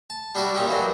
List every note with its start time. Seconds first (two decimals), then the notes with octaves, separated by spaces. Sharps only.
0.10 A5
0.35 G3 D4 E4 F#4 D5
0.54 A#2 C#4 D#4 E4 G4
0.68 E3 F#3 A#3 D4